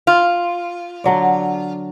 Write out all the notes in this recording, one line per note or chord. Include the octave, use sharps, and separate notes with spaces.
F4
D3 F#3 D5